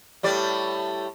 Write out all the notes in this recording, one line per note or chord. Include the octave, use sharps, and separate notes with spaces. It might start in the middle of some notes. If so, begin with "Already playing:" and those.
A2 G3 D5